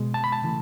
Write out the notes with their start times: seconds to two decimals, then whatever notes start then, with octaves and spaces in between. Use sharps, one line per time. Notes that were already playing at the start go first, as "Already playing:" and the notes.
Already playing: B2 G#3
0.14 A5
0.24 B5
0.32 A5
0.42 C#3 E3 A3